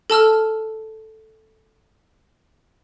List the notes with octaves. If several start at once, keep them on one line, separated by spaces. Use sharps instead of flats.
A4 A5 E6 F6